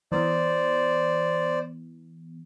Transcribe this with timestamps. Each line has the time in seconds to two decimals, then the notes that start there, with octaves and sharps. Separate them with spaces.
0.12 E3 B3 C5 D5